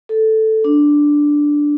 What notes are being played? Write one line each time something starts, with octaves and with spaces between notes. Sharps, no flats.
A4
D4